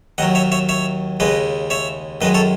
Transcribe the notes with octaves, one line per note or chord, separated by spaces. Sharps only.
D#2 D#3 F#3 D#5 F#5
C#5 E5
C#5 E5
C#5 E5
D#2 C#3 G#3 B4 D#5
C#5 E5
F#2 D#3 G#3 B4 D#5
A4 C#5